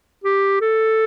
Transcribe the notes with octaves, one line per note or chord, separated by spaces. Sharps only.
G4
A4